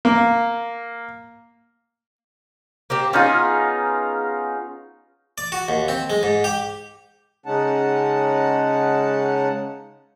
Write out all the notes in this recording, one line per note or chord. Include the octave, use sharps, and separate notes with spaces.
A#3
A#3 C4 G4
B3 C#4 D#4 F4 G#4
D5
F#4
D#2
C4
G#3
G#2
G4
C#3 G#3 C#4 D#4 F#5 A5